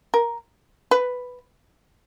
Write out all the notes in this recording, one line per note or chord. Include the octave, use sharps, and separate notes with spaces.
A#4
B4